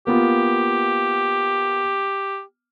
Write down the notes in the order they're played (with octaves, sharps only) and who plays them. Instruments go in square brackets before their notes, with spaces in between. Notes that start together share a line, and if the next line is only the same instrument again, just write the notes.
[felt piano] A#3 B3 F4 [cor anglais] G4